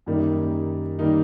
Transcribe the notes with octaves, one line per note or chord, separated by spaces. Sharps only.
F#2 D#3 G3 A#3 D#4
D#3 G3 A#3 D#4